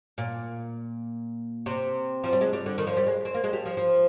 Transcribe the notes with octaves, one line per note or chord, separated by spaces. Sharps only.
A#2
C3
F3
G3
G#3
G3
D3
D#3
F3
G3
G#3
C4
A#3
G#3
G3
F3
F3